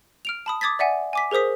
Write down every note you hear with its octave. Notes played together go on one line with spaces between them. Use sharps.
F6 D7 F7
A5 B5 D#6
D6 D#6 G#6 A6 B6
D5 E5 F#5 G#5
G#5 D6 B6
G#4 A#4 C5 D#6 B6